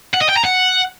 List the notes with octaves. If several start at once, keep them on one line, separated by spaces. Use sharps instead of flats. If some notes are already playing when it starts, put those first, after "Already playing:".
F#5
D#5
G5
A#5
F#5